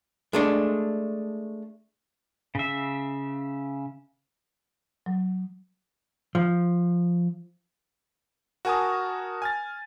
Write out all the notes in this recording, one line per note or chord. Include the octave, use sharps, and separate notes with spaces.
G#3 A3 D4
C#3 E5
F#3
F3
F#4 A#4 G#5 A5 D#6
G#5 F6 A6